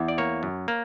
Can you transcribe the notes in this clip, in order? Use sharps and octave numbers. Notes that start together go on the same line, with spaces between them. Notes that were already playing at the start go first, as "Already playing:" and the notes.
Already playing: E2
D5
A#3 C#5
F#2
A#3